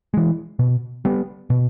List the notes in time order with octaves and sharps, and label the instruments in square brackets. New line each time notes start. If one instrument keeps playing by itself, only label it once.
[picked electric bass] E3 G#3
B2
G3 B3
B2